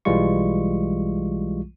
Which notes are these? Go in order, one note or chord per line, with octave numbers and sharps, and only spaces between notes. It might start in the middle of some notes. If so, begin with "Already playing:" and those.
B1 E3 G3 G#3 F4 C#6